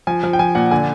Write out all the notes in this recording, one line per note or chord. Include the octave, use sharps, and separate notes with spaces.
F3 G#5
F3
G5
F3 G#5
A#2 F#5
D3 G#5